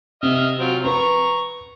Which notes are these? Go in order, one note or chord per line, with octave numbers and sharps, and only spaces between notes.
C3 D#5 E5 F6
F#3 C4 F4
B4 A#5 C#6